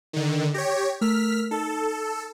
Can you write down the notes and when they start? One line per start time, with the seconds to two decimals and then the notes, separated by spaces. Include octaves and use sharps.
0.13 D3 D#3
0.54 G4 C#5 A#6
1.01 A3 A#4 E6 F6 B6
1.51 D#4 A4